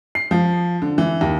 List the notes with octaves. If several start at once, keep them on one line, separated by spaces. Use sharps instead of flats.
C7
F3
D3
E3
D#2